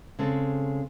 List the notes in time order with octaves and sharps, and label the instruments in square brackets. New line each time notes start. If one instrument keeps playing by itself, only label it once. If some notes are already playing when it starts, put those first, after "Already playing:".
[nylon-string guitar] C#3 G#3 C4 A4